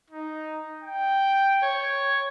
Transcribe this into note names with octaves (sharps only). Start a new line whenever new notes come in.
D#4
G5
C#5